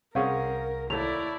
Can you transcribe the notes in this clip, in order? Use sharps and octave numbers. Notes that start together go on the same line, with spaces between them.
C2 C4 C#4 G#4 A#4 F5 F#5
D#2 A3 E4 D5 F7